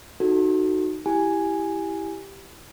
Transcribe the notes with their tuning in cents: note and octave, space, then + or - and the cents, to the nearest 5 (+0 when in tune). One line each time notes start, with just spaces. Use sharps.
D#4 -5 F#4 +0 A4 +0
E4 +0 G4 +0 G#5 +0